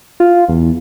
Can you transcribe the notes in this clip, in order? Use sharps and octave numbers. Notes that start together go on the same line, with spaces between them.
F4
E2